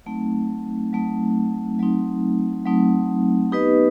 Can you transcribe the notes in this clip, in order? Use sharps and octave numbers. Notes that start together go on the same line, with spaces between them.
F#3 A3 C4 D#4
F#3 A3 C4 D#4
F#3 A3 C4 D#4
F#3 A3 C4 D#4
B3 D#4 G4 B4 D#5